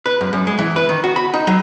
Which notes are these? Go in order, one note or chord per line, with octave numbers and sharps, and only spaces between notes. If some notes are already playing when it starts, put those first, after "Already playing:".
B4
F#2
F#2
G#3
E3
B4
D#3
F#4
B5
D#4
F#3